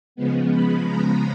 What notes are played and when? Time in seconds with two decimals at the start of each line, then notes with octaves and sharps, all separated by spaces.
0.16 C#3 F3 G#3 B3
0.50 B5
0.85 A#5